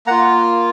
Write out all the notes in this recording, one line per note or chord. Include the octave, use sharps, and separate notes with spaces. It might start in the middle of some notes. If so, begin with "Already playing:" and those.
A#3 F4 F#5 A#5